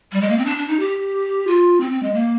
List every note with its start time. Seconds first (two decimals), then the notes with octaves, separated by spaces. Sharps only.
0.12 G3
0.21 G#3
0.29 A#3
0.38 C4
0.45 D4
0.58 D4
0.68 D#4
0.79 G4
1.47 F4
1.80 C4
1.92 C4
2.03 G#3
2.14 A#3